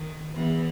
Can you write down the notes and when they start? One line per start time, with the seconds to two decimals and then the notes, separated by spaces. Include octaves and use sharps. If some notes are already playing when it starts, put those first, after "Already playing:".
Already playing: D#3
0.35 E2 E3